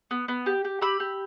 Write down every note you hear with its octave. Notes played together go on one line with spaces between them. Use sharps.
B3
B3
G4
G4
G4 B5 E6
G4